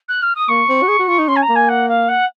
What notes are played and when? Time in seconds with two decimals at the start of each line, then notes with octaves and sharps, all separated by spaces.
0.08 F#6
0.22 F6
0.35 D#6
0.48 A#3 C#6
0.69 C4
0.83 F#4
0.88 G#4
0.99 F#4
1.08 F4
1.19 D#4
1.28 C#4 C6
1.36 G#5
1.42 A#5
1.49 A#3
1.55 G#5
1.68 F#5
1.88 F5
2.08 F#5